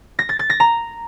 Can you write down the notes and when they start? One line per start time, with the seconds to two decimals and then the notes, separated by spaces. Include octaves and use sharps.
0.19 A#6
0.29 A6
0.39 A6
0.50 A#6
0.60 A#5